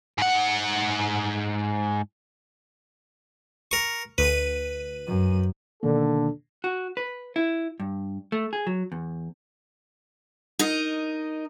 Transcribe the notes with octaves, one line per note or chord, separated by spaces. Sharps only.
G#2 F#5
A#4 C#6
D2 B4 D#7
F#2
B2 D3 D#3 A#3 D4 A4
F#4
B4
E4
G2
A3
G#4
F#3
E2
D#4 A#4 D#5